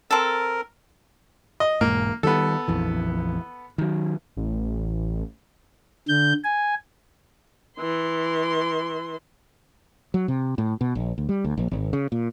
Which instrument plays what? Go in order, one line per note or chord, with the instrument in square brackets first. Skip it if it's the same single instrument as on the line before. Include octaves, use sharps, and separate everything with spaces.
[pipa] C4 A4 [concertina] A#4
[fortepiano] D#5
[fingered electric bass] E1 G#2 [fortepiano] A#3
[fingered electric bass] D#3 G3 [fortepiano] B3 A4
[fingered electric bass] A#1 F2 E3
D#3 F#3
[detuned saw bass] A1
[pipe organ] D3 G6
G#5
[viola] E3 C6
[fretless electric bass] F#3
C3
A2
B2
A#1
D2
G3
D2
A#1
G#1
C#3
A#2